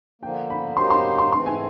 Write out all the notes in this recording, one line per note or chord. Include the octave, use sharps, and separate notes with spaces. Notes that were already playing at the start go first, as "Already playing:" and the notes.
D3 F3 A#3 G5
B5
F#3 A#3 D#4 G4 C5 C6
C6
C6
G#2 E3 A3 C4 C6
G#5